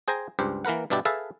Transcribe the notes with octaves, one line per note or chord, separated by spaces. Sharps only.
G#4 C5 G5 G#5 A#5
C#2 G2 G4 C5
E3 A#3 A#4 B4 F#5
G2 B2 D4 E4 G4 A5
G#4 A4 B4 E5 F5 A5